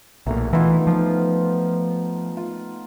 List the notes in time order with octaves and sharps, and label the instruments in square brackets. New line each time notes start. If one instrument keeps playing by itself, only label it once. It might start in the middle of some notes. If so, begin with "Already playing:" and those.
[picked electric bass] B1 A#2 [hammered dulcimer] A3 A#5
[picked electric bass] E3 [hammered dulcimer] B3 D#4 F4
[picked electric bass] F3 [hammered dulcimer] B3 F4
[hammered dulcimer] F4